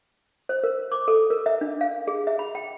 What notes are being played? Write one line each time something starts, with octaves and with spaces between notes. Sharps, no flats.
C5
A#4
D6
A4
A#4
E5
D4
F5
G#4
E5
B5
G5